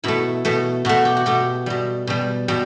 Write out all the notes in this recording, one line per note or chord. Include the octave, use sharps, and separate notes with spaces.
B2 A3 E4
B2 A3
B2 A3 F#4
G4
F#4
B2 A3 G4
B2 G3
B2 G3
B2 G3